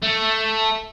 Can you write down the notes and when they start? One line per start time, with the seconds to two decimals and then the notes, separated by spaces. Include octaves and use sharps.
0.02 A3